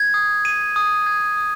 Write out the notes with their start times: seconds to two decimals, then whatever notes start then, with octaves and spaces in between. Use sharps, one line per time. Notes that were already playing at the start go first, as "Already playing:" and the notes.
Already playing: G#6
0.14 D#6
0.45 D#7
0.76 D#6
1.06 G#6
1.37 D#6